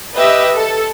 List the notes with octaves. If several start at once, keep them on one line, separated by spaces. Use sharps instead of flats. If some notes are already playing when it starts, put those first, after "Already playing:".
G4 B4 D#5 E5
A4